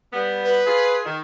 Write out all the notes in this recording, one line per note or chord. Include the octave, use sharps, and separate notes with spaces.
G3 B3
B4
F4 G#4
D#3